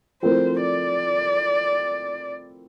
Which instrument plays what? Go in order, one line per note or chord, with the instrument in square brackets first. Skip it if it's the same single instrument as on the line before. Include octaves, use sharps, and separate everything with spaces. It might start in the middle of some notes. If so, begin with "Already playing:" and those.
[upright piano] F3 A3 C4 E4 A#4 [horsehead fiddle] C5
[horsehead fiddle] D5